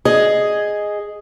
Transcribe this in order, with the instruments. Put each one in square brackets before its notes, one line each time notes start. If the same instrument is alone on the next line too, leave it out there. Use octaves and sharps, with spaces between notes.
[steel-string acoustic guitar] G#4 D#5